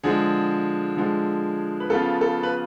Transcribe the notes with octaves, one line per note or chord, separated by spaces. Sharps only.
D3 F3 G#3 G#4
D3 F3 G#3
B4
C#3 F3 B3 F4 A4
A4
B4